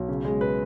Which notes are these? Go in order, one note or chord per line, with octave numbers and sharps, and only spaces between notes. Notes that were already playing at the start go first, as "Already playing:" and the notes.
Already playing: B1
C#3
G#3
B4